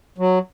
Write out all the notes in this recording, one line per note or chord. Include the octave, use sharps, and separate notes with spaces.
F#3